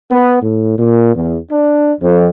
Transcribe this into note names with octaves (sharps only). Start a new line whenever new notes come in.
B3
A2
A#2
E2
D4
F2